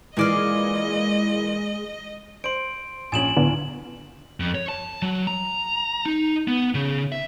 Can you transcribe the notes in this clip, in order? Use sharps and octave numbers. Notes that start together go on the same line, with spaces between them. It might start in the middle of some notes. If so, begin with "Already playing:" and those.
A#2 E3 G#3 A#3 D5 D#5 F5
C5 C6 D7
A#1 C#4 G#5 E7 F#7
D1 D3 B3
F2
C#5
A5
F#3
A#5
D#4
B3
C#3
E5